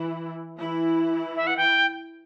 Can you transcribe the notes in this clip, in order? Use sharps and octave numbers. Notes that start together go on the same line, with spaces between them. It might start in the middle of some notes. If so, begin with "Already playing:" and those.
Already playing: E3 E4
E3 E4
E5
F#5
G5